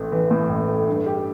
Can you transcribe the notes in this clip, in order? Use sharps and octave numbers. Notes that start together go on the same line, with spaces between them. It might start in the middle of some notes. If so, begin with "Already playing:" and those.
Already playing: A1 A3
E3
A2
A1
A3
G2
G4